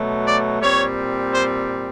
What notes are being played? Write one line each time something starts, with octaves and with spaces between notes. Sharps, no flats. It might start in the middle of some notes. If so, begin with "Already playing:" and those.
Already playing: B2 F#3 A3
D5
A#2 G3 C4 C#5
C5